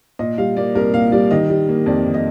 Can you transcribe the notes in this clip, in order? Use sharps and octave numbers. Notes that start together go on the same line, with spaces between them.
A#2 D#5
G3 F5
A#3 D5
C2 A#4
A#2 F5
G3 D5
D#3 D#5
G3
A#3
F2 D5
D#3
D#5